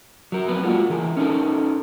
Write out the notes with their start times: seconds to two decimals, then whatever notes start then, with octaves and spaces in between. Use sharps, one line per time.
0.32 F#3 A#4
0.48 F2 B3 A#4 B4
0.63 G#3 A#3 F4 F#4
0.90 E3 G#4 A#4
1.17 C#4 D#4 A4 A#4